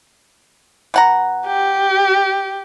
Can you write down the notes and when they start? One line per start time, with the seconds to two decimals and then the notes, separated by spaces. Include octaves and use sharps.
0.94 B2 F#5 A#5
1.47 G4